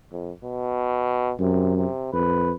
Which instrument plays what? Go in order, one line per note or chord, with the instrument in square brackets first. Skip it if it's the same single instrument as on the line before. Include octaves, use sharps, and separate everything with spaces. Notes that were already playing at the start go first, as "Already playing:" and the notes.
[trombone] F2
B2
[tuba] F#2 [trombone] C3
[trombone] C3
[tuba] F2 [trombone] B4